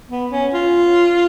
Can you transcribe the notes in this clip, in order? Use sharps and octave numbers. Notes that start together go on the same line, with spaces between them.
B3
C#4
F4